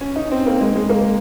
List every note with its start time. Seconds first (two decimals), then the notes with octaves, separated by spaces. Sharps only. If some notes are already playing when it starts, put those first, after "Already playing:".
0.01 C#4
0.16 D#4
0.31 C4
0.46 A#3
0.61 G#3
0.76 G#3
0.89 A#3